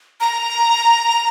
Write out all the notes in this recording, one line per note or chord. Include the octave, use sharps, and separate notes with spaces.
A#5